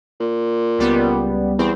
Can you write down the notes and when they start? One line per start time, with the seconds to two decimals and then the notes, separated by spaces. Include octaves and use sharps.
0.20 A#2
0.78 C#2 G3 B3
1.59 E2 C4